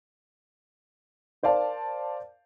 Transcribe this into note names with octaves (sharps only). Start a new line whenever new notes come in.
A#4 C5 D5 F5 A5